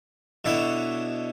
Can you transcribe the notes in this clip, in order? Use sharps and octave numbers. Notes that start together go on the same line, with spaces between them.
B2 D3 E4 C#5